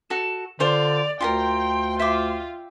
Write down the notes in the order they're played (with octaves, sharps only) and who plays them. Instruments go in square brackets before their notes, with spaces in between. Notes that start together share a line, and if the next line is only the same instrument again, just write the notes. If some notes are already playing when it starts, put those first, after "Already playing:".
[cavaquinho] F#4 A4 [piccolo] E7
[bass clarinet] D3 [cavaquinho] F4 C5 C6 [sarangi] D5 [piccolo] F7
[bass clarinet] D2 [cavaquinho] F4 G4 A#4 [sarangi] G5 [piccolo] C6
[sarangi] F4 [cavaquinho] E5 G5 D6